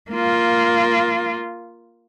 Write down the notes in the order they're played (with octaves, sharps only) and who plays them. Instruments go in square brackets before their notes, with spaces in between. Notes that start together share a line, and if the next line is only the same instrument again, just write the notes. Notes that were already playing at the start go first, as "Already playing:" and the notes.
[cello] A#3 F4